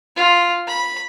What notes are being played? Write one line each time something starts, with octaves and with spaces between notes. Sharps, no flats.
F4
B5